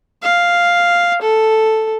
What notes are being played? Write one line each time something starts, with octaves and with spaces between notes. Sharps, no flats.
F5
A4